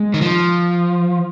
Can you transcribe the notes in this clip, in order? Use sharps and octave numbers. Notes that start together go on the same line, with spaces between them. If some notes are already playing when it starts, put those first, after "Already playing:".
Already playing: G#3
D#3
F3